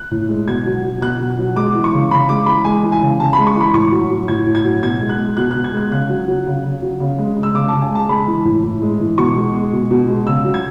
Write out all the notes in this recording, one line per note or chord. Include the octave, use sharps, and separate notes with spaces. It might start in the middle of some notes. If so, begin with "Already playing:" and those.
Already playing: F#6
A2
G#3
B2 G#6
F#3
F#3
B2 F#6
B2
F#3
G#3 D6
E3
C#6
C#3
C#3 B5
G#3 D6
E3 B5
G#3 G#5
E3
G#5
C#3
C#3 A5
B5
G#3
C#6
E3
B5
A2 C#6
F#3
F#3
A2 G#6
A2
G#6
F#3
B2 G#6
G#3
F#6
G#3
B2 F#6
F#6
B2
G#6
G#3 F#6
C#3 F#6
F#3
F#3
C#3
C#3
F#3
C#3
G#3
G#3
E6
C#3 D6
A5
C#3
G#5
G#3 A5
G#3 B5
E3
A2
A2
G#3
E3
B2 C#6
G#3
G#3
B2
B2
G#3
C#3 E6
F#3
G#6